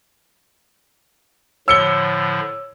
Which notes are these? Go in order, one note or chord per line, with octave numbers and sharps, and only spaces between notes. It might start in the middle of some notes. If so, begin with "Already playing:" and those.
A2 D3 F3 C#5 E6 C#7 G7